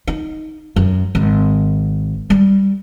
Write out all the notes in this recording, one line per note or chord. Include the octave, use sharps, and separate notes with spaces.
D#4
F#2
G#1
G3